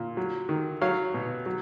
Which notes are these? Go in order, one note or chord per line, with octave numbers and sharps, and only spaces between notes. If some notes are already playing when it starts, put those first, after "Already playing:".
Already playing: A#2
F#3
D#3
F#3 C#5 F5
B2
F#3